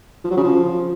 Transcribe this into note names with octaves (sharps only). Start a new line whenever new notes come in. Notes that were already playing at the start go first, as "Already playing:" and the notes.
F3
F#3
C#3
F3